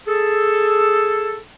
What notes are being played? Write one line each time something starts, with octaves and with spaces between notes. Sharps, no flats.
G#4 A4